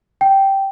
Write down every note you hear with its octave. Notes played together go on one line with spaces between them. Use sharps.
G5